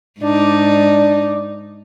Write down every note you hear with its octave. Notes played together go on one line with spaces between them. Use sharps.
G#2 D4 D#4 D5